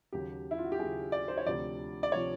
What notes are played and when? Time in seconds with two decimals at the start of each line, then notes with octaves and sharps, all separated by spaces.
0.12 D#2 C#3 F#3 G4
0.51 E4
0.58 F4
0.65 F#4
0.72 G4
0.79 D#2 C#3 F#3 G#4
1.12 D5
1.28 C5
1.38 C#5
1.46 D2 C3 F3 D5
2.03 D5
2.12 C3 F3 C#5